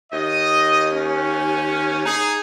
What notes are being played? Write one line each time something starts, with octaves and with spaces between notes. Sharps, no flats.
D#2 D#5
C#4
D#4 G#4